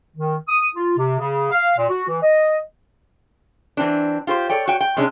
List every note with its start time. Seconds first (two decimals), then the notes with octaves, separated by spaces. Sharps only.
0.17 D#3
0.48 D#6
0.75 F4
0.97 C3
1.19 C#3
1.51 F5
1.77 A#2
1.89 F#4
2.08 E3
2.22 D#5
3.77 E3 C4 D4
4.27 F4 G4 B4 C5
4.49 A4 C#5 D5 G5
4.67 F#4 C#5 G5
4.80 G5
4.97 C3 G#3 C#4 D4